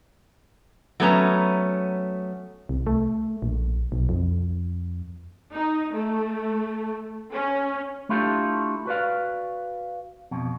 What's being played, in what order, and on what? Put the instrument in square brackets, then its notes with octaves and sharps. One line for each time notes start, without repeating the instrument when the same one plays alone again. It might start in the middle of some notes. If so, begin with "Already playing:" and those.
[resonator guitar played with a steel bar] F#3 A3 B3 C#4 A#5
[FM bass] C2
A3
A#1
B1
F2
[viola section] D#4
A3
C#4
[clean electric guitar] A3 D4 E4 F4 G4 A4
F#4 B4 D5 F5
F2 B2